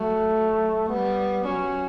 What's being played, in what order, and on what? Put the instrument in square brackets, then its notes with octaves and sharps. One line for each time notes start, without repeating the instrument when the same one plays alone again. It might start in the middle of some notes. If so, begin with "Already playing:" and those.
Already playing: [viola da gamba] F#3 [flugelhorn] A3
[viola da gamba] F#3
[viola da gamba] G3 [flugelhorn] B3
[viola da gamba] F#3 [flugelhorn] C#4